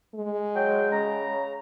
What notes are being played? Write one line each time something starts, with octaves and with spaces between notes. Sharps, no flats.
G#3
F#3 G5
C#3 A#5